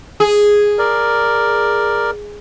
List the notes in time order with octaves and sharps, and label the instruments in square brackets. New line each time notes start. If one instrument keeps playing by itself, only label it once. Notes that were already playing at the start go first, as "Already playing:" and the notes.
[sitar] G#4
[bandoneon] A#4 D5